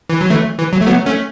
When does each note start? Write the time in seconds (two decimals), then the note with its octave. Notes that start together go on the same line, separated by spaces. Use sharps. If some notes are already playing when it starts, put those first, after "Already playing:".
0.10 E3
0.21 F#3
0.30 E3 A3
0.59 E3
0.73 F#3
0.81 A3
0.87 F#3 B3
1.06 A3 C#4